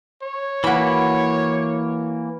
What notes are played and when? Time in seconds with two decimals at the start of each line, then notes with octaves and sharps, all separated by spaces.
0.22 C#5
0.64 E3 A#3 F#4 B5